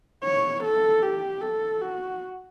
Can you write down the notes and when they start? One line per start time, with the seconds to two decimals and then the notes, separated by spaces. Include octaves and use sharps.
0.24 C#5
0.64 A4
1.02 G4
1.41 A4
1.81 F#4